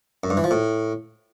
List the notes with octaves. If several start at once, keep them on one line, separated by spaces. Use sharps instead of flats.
F#2
G2
E3
F3
A2